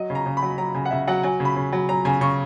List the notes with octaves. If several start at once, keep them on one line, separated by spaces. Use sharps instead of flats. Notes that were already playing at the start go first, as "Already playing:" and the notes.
Already playing: F#3 D#5
C#3
A#5
C#3
B5
F#3
F#3 A#5
C#3 G#5
F#5
C#3 E5
F#3 F#5
F#3 G#5
C#3
B5
C#3
F#3
F#3 A#5
C#3 G#5
C#3 C#6